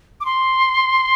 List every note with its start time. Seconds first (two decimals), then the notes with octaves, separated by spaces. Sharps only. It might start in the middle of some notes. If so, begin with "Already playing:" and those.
0.21 D6
0.25 C6